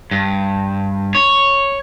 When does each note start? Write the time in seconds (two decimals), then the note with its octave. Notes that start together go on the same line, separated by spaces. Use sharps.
0.11 G2
1.15 C#5